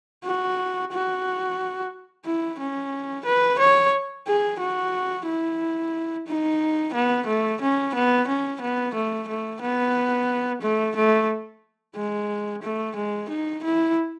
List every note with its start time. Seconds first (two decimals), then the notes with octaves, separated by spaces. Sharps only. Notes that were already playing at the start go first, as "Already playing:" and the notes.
0.25 F#4
0.93 F#4
2.25 E4
2.60 C#4
3.26 B4
3.59 C#5
4.27 G#4
4.60 F#4
5.27 E4
6.28 D#4
6.94 B3
7.27 A3
7.62 C#4
7.95 B3
8.28 C#4
8.61 B3
8.95 A3
9.29 A3
9.61 B3
10.62 A3
10.96 A3
11.96 G#3
12.63 A3
12.96 G#3
13.29 D#4
13.64 E4